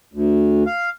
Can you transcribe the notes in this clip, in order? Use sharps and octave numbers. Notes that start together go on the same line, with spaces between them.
D2
F5